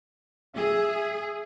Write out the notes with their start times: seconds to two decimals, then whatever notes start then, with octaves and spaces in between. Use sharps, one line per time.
0.56 G#4 E5